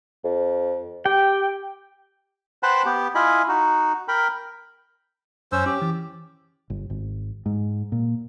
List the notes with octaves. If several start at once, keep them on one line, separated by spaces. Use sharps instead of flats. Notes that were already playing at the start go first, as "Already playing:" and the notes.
F2
G4 G5
B4 C5 F#5 G5 A5 B5
B3 G4
E4 F4 D#5 G#5 B5
D#4 F#4
A#4 G5 B5
F#2 C#4 C5 E6
C#4 G4
E3
G1
G#1
G#2
A#2